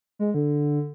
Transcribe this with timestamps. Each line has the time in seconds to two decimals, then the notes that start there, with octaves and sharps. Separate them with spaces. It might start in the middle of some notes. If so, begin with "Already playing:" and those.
0.19 G#3
0.34 D3